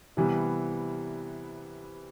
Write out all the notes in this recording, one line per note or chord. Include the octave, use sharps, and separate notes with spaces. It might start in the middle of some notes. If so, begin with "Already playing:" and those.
C3 E3 G3 B3